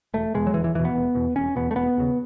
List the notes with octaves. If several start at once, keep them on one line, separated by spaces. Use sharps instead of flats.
E1 A3
E2 B2 G#3
F#3
E1 E3
E3
E2 B2 E3
B3
E1
E2 B2
E1 C#4
E2 B2 B3
A3
E1 B3
D#2 C#3